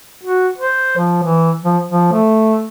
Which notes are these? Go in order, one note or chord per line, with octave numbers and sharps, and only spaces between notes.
F#4
C5
F3
E3
F3
F3
A3